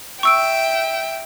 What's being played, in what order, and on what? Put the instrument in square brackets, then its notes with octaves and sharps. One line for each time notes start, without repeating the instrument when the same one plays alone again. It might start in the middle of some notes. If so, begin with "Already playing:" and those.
[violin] E5 G5 [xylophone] C#6 E6 D7